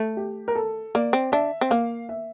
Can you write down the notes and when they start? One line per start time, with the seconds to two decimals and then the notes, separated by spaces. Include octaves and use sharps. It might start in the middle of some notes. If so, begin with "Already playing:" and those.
Already playing: A3
0.17 G4
0.48 A#4
0.55 A4
0.95 A#3 D5
1.13 C4
1.32 D4 E5
1.61 C4
1.70 A#3 F5
2.09 E5